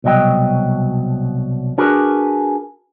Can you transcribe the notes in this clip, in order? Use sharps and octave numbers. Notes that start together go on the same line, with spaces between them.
C2 B2 F#3 D#5 G5
D4 F#4 G#4 A#4 B4